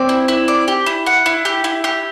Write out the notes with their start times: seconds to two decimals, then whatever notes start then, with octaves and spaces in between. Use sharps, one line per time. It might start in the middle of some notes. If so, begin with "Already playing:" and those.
Already playing: C4 D5
0.09 E4
0.28 E4
0.48 D5
0.68 G4
0.86 E4
1.06 F#5
1.26 E4
1.45 G4
1.64 E4
1.84 G4